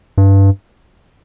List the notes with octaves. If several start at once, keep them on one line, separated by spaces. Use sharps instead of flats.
G2